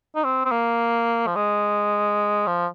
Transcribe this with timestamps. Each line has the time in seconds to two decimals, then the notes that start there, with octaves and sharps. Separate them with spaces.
0.16 D#4
0.24 C4
0.45 C4
0.51 A#3
1.27 F3
1.35 G#3
2.47 F3